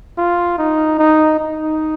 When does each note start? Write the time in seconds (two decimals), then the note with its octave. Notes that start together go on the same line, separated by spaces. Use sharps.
0.18 F4
0.58 D#4
0.99 D#4
1.40 D#4